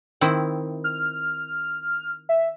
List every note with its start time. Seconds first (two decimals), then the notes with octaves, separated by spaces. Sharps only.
0.21 D#3 C4 E4
0.84 F6
2.29 E5